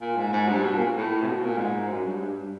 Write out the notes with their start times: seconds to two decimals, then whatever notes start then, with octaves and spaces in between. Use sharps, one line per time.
0.01 A#2
0.17 G#2
0.33 G#2
0.48 G2
0.64 B2
0.75 A#2
0.96 A2
1.22 C3
1.27 B2
1.43 A#2
1.58 G#2
1.89 F#2
2.04 G2
2.21 G2